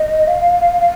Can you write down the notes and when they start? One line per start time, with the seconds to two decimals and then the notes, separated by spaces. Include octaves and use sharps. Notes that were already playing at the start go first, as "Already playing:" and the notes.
Already playing: D#5
0.27 F5